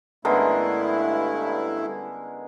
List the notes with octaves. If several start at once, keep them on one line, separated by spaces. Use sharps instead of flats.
G2 D3 G#3 A3 B3 C#4 E4 A#4